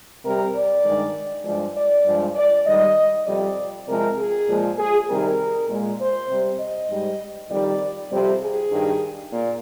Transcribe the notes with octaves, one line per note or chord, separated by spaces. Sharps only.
C3 G3 A#4
D5
G2 D#3 G#3
G2 F3 G#3 D5
D5
G2 F3 G#3
D5
G#2 D#3 G3 D#5
F2 C3 G3 D5
C3 F3 G#3 A#4
G#4
A#2 F3 G#3
G#4
C3 D#3 G3 A#4
A#2 G#3
C5
C3 G3
D#5
G#2 G3
F2 D#3 G3 D5
F2 C3 G3 C5
G#4
G2 D#3 G3
A#2